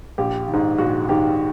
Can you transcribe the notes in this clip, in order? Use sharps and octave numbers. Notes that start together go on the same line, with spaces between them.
A#1 G4
D#3
G#2
A#1 F#4
G#2 D#3 G4